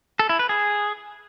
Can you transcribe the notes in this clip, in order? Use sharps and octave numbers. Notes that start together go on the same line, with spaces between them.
A4
E4
B4
G#4